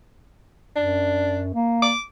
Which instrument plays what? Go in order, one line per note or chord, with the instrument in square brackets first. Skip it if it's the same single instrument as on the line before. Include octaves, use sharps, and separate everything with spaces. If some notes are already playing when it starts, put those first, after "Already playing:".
[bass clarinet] F#2 [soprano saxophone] D4
[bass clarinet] A#3
[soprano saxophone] D6